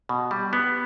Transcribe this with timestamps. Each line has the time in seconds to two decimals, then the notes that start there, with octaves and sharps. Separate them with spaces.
0.09 B2
0.31 G3
0.53 B3